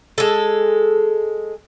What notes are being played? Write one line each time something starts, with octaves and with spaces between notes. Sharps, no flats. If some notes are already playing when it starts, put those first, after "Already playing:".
G#3 A4